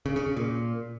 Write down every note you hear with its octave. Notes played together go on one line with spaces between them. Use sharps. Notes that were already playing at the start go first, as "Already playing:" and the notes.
C#3
C#3
C#3
A#2